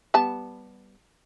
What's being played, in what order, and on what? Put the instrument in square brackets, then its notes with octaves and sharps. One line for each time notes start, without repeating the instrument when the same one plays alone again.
[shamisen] G3 B3 A5